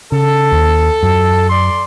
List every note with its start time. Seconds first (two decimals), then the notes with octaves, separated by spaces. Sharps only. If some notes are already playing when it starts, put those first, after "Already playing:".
0.12 C#3 A4
0.52 D#2
1.03 F#2
1.49 D5 C6